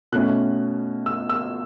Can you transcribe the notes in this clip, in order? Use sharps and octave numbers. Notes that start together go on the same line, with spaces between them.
B2 A3 C#4 E4 F#6
E6
E6